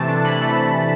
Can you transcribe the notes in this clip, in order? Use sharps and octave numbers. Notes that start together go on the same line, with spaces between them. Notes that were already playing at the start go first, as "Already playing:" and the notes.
Already playing: C3 E3 A3 A5
D4
E3 B5
A3